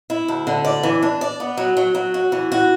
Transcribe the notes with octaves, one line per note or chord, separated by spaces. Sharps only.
E4
D2
D3
D5
E3
D4
D5
B3
F#3
F#3
F#3
F#4
E3
F#4